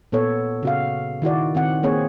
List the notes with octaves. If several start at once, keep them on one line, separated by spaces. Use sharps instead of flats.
A#2 B3 A4 C#5
C#3 F#4 F5
D#3 E4 F#4 D5
D#3 C4 F#5
A#3 C4 G#4 C#5